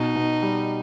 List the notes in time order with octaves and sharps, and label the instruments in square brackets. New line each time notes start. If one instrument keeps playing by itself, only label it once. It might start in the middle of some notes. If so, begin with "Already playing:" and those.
Already playing: [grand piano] B2 [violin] D#4
[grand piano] B2
G3